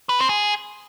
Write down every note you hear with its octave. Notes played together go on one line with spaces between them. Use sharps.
B4
C4
G#4